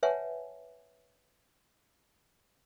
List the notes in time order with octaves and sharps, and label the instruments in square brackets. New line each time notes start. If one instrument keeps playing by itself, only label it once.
[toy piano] B4 C#5 E5 F#5 G#5 A5